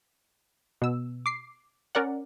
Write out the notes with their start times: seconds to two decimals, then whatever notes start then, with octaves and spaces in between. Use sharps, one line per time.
0.82 B2 E6
1.26 D6 C7
1.95 C#4 A#4 D5 F#5